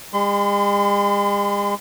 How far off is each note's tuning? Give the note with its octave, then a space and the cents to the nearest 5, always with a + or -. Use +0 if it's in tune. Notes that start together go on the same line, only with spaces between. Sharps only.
G#3 -45 C6 -35